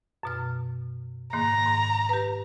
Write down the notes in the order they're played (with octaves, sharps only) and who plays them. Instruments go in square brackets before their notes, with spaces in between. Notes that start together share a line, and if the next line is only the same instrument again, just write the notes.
[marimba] F#2 B2 F6
[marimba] G#2 D#3 A#3 [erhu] A#5
[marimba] G#2
G4 B4